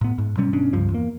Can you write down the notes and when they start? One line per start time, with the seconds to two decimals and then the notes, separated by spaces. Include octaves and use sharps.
0.01 A2 B3
0.18 G#2
0.37 B2 F#3 G3 C#4
0.53 G1 B2 C#4 D4
0.73 C#2 G2 F3
0.90 E2 A#3